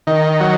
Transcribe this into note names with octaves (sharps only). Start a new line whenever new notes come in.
D#3
F#3